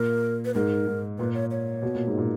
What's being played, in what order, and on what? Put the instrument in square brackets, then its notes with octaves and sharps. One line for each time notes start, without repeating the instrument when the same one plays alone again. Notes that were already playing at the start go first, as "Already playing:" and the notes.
Already playing: [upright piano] A#2 [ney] A#4
[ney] B4
[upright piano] G#2 [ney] A#4
[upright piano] G#2
[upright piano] A#2 [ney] B4
[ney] C#5
C#5
[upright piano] B2
A#2
G#2
A#2